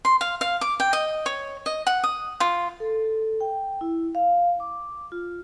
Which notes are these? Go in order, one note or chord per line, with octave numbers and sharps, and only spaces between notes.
C6
F5
F5
D6
G5
D#5
C#5
D#5
F#5
D#6
F4
A4
G5
E4
F5
D6
F4